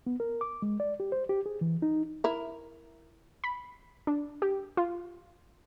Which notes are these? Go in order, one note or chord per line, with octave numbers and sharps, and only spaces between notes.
B3
A#4
D6
G#3
D5
G4
C5
G4
G#4
E3
D#4
E4 A#4
B5
D4
G4
F4